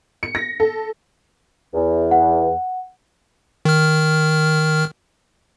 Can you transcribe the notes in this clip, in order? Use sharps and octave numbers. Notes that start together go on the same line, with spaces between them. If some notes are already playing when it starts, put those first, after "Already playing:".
C#7
A#6
A4
E2
F#5
D#3 F6